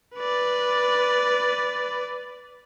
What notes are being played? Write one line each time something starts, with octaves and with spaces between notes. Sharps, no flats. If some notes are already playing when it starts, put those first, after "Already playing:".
B4 D5